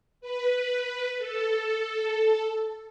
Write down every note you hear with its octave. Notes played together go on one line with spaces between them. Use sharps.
B4
A4